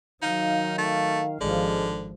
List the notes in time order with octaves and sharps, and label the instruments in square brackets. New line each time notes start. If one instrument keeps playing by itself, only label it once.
[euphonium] D#3 [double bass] F#3 [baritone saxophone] D#4 [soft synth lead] F5
[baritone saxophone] A3
[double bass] G#1 F3 [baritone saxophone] D3 [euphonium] G#3